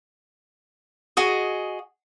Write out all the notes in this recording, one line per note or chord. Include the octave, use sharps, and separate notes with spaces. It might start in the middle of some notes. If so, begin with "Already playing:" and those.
F#4 G#4 D#5